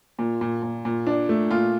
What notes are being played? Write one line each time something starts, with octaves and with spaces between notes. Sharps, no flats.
A#2
A#2
A#2
A#2
D4
A3
A#2 F4